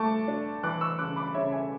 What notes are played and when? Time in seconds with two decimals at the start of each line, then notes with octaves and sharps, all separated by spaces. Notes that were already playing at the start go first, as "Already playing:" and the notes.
Already playing: A3 A5 C#6 D6
0.28 D4
0.63 E3 D6 F#6
0.81 C#6 E6
0.99 C#3 D6 F#6
1.16 B5 D6
1.34 C#3 C#5 E5
1.52 E5 G#5